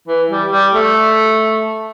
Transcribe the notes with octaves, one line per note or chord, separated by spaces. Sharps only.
E3
G3
G3
A3